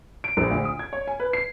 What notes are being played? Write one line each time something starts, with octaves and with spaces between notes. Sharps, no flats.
D7
A#1
D2
D#6
G#6
C#5
G#5
B4
C7